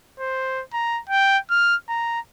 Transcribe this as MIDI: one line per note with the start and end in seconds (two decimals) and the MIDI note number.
0.20 0.63 72
0.74 1.00 82
1.10 1.38 79
1.50 1.76 89
1.89 2.20 82